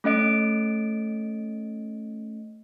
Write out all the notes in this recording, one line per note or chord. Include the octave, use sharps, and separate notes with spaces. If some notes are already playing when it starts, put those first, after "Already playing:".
A3 C#4 D#5 D7